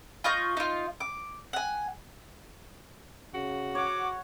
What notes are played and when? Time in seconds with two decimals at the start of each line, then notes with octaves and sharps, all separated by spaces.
0.24 F4 D#5 C#6 G6
0.57 D#4 F4
1.00 D6
1.53 F#5 G#5
3.34 C#3 F#4
3.75 C#5 F#5 D6